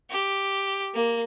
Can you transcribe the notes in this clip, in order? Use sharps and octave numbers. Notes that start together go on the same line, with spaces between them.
G4
A#3